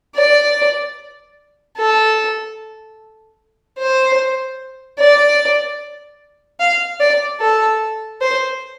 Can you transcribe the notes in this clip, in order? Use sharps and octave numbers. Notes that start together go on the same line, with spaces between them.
D5
A4
C5
D5
F5
D5
A4
C5